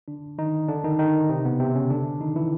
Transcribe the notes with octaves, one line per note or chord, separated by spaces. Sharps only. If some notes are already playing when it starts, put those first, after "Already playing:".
D3 D4
D#3 D#4
D3 D4
D#3 D#4
D#3 D#4
C3 C4
B2 B3
C3 C4
C#3 C#4
D3 D4
D#3 D#4
E3 E4